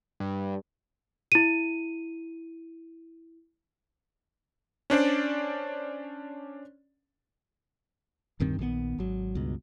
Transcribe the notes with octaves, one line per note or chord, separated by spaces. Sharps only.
G2
E4 D#7
C#4 D4 C5 D5
D1 G2 D#3 C4
A#1 D#3 E3 B3
G#1 F#3
C#2 G2 B2